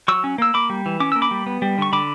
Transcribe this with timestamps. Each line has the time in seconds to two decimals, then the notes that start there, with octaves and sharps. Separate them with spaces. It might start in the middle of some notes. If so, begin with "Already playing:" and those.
0.08 F#3 C#6 E6
0.24 C#4
0.38 A#3 E6
0.54 A#3 B5 D6
0.70 G3
0.86 E3
1.00 C#4 D6
1.12 A#3 E6
1.22 B5 D6
1.31 G3
1.46 B3
1.62 G3
1.78 D3 C#6
1.93 D3 B5 D6